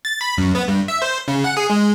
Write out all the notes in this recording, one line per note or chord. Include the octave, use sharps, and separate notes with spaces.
A6
B5
F#2
B3
G2
E5
C5
C#3
F#5
G#4
G#3